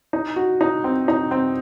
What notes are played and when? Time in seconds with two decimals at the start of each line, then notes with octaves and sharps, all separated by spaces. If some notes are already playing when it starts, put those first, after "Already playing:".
0.13 D#4
0.36 F#4
0.61 D#4
0.84 C4
1.08 D#4
1.31 C4